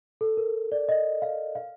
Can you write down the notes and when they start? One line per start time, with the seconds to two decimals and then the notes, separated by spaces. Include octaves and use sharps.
0.21 A4
0.37 A#4
0.72 D5
0.89 D#5
1.22 F5
1.55 F5